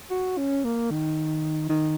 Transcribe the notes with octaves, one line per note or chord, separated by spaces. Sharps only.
F#4
C#4
A#3
D#3
D#3